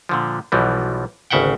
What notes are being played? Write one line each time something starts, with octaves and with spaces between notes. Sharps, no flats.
A#2 D3 F3
B1 B2 E3 F3 G3
G#1 D2 C#3 E5 F#5 G5